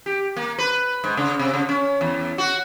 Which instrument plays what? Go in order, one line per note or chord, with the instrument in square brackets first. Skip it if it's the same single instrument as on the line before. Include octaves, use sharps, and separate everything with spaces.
[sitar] G4
A#3
B4
G#2
C#3
C3
C#3
C#4
E2
F#4